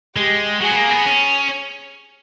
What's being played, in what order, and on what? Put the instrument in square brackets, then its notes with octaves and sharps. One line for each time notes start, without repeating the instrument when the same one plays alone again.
[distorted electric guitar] G#3 [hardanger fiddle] G4
[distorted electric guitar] F#3 [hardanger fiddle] G#4
[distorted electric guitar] B3
A#3
B3
C#4